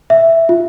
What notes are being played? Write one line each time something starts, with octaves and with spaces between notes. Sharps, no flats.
E5
F4